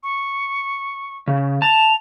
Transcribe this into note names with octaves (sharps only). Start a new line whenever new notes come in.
C#6
C#3
A5 F7